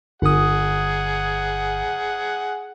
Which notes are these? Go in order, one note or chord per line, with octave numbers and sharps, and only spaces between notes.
G1 G#4 F#5 D#6